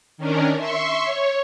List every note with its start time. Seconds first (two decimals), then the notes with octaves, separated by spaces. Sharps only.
0.18 D#3 C#4 D4 A#4
0.58 E5 C6 C#6
1.04 C#5